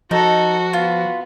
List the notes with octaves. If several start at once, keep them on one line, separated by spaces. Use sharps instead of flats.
F3 D#4 F#4 A4
B3 F4